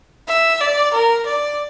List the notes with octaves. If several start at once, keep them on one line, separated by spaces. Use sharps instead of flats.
E5
D5
A#4
D5